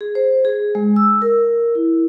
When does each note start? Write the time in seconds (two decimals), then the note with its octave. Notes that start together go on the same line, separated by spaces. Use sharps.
0.01 G#4
0.15 C5
0.45 G#4
0.75 G#3
0.96 E6
1.22 A#4
1.75 E4